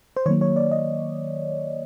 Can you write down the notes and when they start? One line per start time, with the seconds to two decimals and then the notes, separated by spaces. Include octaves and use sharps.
0.17 C5
0.26 D#3 F#3 A#3 C#5
0.41 C#5
0.56 D5
0.71 D#5